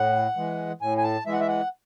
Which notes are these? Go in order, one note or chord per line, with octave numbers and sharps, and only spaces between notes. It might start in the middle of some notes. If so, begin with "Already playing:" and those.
Already playing: A2 F#5
E3 G#3
A2 G#5
G#5
A5
E3 G#3 E5
F#5
E5
F#5